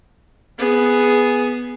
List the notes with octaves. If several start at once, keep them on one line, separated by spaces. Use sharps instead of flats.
B3 G#4